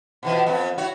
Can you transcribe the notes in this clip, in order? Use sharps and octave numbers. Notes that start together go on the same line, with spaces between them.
B2 E3 F3
F2 B3
E4 F#4 C#5